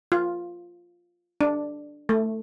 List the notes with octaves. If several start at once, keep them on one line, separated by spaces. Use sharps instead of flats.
F4
D4
A3